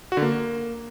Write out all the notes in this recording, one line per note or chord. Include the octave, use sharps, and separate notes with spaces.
F#4
D3
A#3